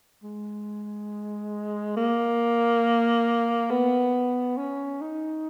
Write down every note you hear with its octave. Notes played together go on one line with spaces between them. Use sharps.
G#3
A#3
B3
C#4
D#4